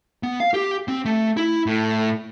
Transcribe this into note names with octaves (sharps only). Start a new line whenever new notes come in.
B3
F5
G4
C4
A3
E4
A2